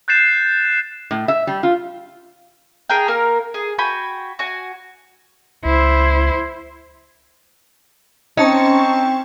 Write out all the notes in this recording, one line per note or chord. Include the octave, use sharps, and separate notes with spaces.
F#6 G6 A6 C7 E7
A2
E5
G3
F4
G#4 A#4 G5
A#3 A#4 F6
G#4
F#4 G5 G#5 B5
F#4 G#5
C#2 E4 C5
C4 C#4 D#4 A5 C#6